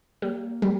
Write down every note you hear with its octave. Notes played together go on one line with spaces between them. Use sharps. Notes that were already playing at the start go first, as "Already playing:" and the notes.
G3 A#3
G3